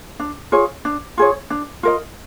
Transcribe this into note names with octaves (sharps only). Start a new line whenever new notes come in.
D4
F4 G#4 C#5
D4
F4 G#4 C#5
D4
F4 A#4 D#5